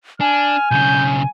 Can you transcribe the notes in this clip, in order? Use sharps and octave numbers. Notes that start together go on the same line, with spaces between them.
D4 G#5 F6
B1 C#3 G6